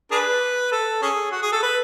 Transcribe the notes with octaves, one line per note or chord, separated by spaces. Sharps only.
D4 G#4 B4
A4
C#4 G#4
F#4
G#4
A4
B4